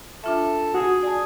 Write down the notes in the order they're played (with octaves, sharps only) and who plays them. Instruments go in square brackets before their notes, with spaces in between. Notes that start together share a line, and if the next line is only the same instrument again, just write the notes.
[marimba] D4 F4 E5 [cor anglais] A4
[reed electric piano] F#4 [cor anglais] G#4
[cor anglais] G#4 [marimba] D5 A5